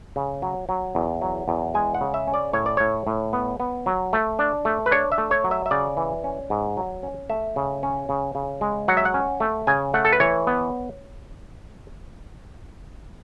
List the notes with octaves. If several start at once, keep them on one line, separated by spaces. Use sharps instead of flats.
C#3
F#3
F#3
E2
F#3
E2
G#3 G#5
F#5
C#3
E5
C#4
D5
A2 C#5
D5
A2 C#5
A2
B3
B3
F#3
A3
D4
A3
B4
D4 C#5
E5
A3
C#5
F#3
E5
E5
C#3 D5
E3
C#4
G#2
F#3
C#4
A3 E5
C#3
C#4
C#3
C#3
G#3
F#3 F#5
E5
F#5
C#4
A3
C#3 G#5
A3 F#5
A4
B4
E3 C#5
B3